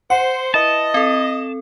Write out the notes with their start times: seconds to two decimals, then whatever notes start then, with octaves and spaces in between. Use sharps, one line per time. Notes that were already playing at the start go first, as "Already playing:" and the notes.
0.10 C5 F#5 C#7
0.54 E4 B4 D#5 A5
0.94 C4 A4